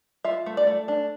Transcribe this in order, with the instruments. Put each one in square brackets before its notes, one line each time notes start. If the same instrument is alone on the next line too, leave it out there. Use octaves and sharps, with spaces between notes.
[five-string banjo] F4 E5
A3
D5
A3
D4